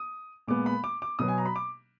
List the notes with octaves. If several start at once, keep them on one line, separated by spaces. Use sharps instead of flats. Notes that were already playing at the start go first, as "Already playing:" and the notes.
Already playing: D#6
A#2 G#3 B3 D6
B5
D6
D6
B2 F#3 B3 D#6
G#5
A#5
B5
D6